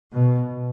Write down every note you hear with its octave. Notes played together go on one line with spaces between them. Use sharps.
B2